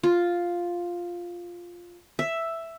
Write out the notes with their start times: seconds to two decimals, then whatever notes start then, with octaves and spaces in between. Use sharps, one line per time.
0.03 F4
2.19 E5